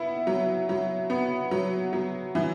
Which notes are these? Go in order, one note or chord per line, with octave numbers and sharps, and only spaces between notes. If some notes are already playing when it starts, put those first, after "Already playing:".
Already playing: B3 E4
F#3
F#3
B3
F#3
F#3
E3